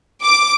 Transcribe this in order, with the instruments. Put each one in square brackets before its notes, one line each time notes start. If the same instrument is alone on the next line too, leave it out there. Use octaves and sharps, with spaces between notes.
[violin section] D6